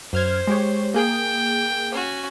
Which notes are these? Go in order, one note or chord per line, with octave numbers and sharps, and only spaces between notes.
F#2 C5 F6 G#6
G#3 G4 C#5
A#3 G#4 G5
C#4 F#4